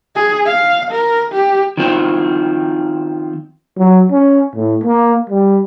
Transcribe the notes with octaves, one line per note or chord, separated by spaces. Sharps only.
G#4
F5
A#4
G4
D#3 F3 C4
F#3
C#4
A2
A#3
G3